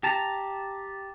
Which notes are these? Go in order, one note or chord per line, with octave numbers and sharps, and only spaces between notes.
G4 A5 A#5